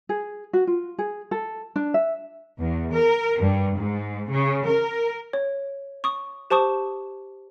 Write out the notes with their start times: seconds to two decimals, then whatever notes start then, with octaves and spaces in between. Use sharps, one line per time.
0.09 G#4
0.53 F#4
0.67 F4
0.99 G#4
1.31 A4
1.76 D4
1.94 E5
2.60 E2
2.93 A#4
3.40 G2
3.77 G#2
4.29 C#3
4.66 A#4
5.33 C#5
6.04 C#6 D#6
6.50 G4 C5 A5 C#6 D#6